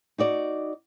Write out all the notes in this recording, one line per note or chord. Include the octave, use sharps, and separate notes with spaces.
D#4 F#4 D5